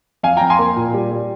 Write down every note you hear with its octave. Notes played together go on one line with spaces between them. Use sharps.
F2 F5 G#5
F2 G5 A#5
G#5 C6
A#3
A#2
G3
G3